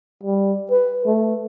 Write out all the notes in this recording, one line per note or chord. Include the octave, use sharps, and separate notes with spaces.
G3
B4
A3